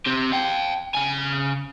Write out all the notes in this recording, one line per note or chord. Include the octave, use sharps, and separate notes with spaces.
C4 G4
F5 G5
C#3 G#5